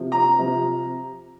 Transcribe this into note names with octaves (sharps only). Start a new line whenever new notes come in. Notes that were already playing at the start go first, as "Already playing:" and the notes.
Already playing: C3 F3
A#5
C3 F3